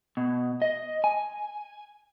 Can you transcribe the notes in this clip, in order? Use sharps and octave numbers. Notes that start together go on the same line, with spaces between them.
B2
D#5
G#5